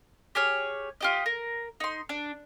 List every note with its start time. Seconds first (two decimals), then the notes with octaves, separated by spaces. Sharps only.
0.35 G4 G#4 C#5 F6
1.01 F4 G4 D#5
1.26 A#4
1.80 D#4 C6
2.09 D4